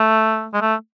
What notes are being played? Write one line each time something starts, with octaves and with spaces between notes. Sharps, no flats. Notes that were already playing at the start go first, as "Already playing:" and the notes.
Already playing: A3
G#3
A3